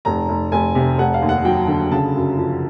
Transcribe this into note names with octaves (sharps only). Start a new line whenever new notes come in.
F1 A#5
F1
F1 G#5
C3
F1 F#5
F5
D#2
F#5
F#3 G5
D3
C#3 A5
F#2
F3